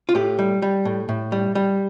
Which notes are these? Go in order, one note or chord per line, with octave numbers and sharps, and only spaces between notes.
F4
A2 G4
G3
G3
A2
A2
G3
G3